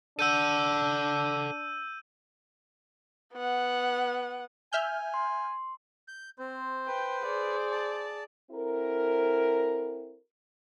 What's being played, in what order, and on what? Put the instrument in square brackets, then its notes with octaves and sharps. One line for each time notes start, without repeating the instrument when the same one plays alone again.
[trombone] D4 [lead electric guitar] A4 F#5 [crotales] E6 G6 D#7
[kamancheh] B3 F#5
[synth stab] E5 F6 G6 [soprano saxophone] G#5
[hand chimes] C6
[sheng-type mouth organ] G6
[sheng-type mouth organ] C4 [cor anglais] C5
[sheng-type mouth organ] B4 [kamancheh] G5
[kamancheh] G#4 D5
[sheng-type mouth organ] A5
[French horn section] C4 E4 F#4 A4 A#4